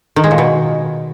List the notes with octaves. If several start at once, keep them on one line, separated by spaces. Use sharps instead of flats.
D#3
G#3
A#2
B2